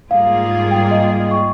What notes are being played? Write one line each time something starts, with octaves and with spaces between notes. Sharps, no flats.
G#2 G3 A#3 F4 G#4 F5
G5
D#5
D#5
C#6